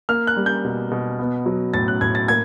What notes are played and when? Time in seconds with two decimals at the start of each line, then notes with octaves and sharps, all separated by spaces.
0.09 A#3 F6
0.27 F#6
0.37 G3
0.46 G6
0.65 B2
0.91 B2
1.19 B3
1.46 F#3
1.74 A2 A6
1.88 F#6
2.01 A2 G#6
2.15 A6
2.28 A#3 G#6